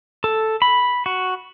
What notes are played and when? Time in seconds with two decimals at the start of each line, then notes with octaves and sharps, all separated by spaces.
0.24 A4
0.62 B5
1.06 F#4